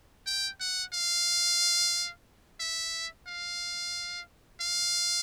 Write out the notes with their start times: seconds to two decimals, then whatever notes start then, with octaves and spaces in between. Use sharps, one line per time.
0.26 G5
0.60 F#5
0.93 F5
2.60 E5
3.27 F5
4.61 F5